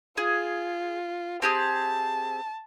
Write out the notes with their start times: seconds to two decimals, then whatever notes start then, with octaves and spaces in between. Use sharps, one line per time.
0.17 F4 G#4
1.42 C4 G4 G#4 A5